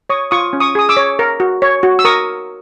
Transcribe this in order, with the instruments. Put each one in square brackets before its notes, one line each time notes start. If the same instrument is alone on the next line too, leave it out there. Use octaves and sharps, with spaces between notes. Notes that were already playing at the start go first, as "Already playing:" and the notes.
[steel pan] C#5 C#6 D#6
F4 C#6 D#6
C#4
C#6 D#6
G#4 D#6
D6 E6
C#5
A#4
F#4
C#5
F#4
E6
A#4 C#6 D#6